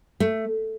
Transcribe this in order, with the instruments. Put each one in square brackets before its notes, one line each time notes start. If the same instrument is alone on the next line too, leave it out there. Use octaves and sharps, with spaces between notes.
[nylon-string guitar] A3